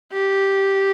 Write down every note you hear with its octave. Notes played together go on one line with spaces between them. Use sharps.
G4